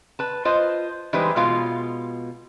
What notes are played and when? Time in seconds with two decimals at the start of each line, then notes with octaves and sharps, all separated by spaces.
0.19 B4 A5
0.45 F4 B4 C5 D#5
1.13 E3 G3 G#3 D#4 B4 C5
1.36 B2 G#3 F4 F5